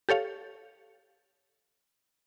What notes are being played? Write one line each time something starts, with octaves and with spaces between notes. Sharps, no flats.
G4 A4 C#5 F5